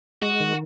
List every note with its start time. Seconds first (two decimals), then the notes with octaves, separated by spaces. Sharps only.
0.22 G#3 F#4
0.40 D#3